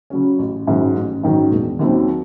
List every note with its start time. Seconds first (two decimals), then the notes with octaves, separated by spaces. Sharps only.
0.10 C#3 F#3 C#4
0.39 A1
0.67 G#2 D#3 F#3 C#4
0.95 A1
1.23 G#2 D#3 F#3 C#4
1.51 E1
1.79 D#2 D#3 F#3 C4